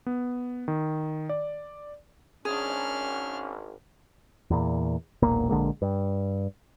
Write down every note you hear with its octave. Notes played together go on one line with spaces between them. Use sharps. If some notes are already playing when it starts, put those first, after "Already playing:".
B3
D#3
D5
G#1 C#4 D4 G#4 F6
E2 A#2
E1 B1 A#2 A#3
A#1 D3 G#3 A#3
G2